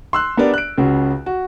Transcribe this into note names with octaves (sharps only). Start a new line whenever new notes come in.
C6 E6 F#6
B3 D4 G4 A#4 D5
F#6 D7
C#2 C#3 F#4
F#4